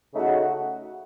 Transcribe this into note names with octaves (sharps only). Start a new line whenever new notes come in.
C#3 A3 D#4 F#4